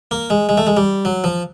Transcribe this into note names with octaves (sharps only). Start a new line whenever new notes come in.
A#3
G#3
G#3
A3
G#3
G3
F#3
F3